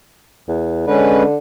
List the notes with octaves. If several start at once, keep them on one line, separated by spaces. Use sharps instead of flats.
E2
D3 G#3 C#4 B4